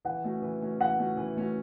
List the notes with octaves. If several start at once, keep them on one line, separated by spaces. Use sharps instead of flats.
E3 F#5
A3 C#4 F#4
E3
A3 C#4 F#4
E3 F#5
A3 C#4 F#4
E3
A3 C#4 F#4